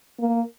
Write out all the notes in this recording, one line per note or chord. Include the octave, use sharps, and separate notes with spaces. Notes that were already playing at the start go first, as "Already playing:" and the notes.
A#3